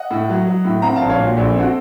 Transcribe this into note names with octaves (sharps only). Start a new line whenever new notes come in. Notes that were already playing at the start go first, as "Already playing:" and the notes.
Already playing: D#5 F#5
A2
F#3
F#3
A2
C4 F#5 A#5
F5 A5
A#1
C#5 F5
A#2 F#4
A#1 A4
C4 F#4
A4